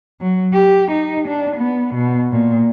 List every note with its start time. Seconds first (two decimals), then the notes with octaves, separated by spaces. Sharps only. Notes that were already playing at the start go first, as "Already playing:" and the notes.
0.21 F#3
0.53 G4
0.91 D#4
1.28 D4
1.57 B3
1.95 B2
2.32 A#2